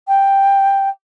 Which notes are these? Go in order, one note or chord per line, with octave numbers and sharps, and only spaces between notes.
G5